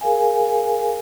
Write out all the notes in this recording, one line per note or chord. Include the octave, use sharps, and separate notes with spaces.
G#4 A#4 F5 G#5